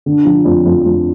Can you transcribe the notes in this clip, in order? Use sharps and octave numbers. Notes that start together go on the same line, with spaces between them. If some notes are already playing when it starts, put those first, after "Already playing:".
D3
F3
F2
F2
F2